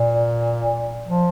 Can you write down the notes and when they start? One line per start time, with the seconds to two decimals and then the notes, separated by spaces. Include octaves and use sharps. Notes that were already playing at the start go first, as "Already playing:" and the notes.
Already playing: A#2
1.07 F3